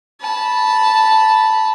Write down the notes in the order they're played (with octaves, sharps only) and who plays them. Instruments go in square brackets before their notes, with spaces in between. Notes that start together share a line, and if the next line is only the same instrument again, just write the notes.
[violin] A5 B5